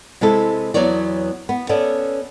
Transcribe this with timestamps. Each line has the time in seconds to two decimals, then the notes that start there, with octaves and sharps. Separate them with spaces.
0.21 C3 G#3 E4 A4
0.74 E2 F#3 B3 C#5 D5
1.49 B3
1.69 B3 C#4 A4 D5 E5